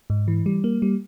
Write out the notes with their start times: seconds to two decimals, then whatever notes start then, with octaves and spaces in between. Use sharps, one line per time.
0.10 G#2
0.28 E3
0.46 G3
0.64 A#3
0.82 G3